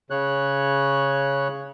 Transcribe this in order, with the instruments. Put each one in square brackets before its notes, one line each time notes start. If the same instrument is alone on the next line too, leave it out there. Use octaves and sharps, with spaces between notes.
[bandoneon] C#3 C#5 F#6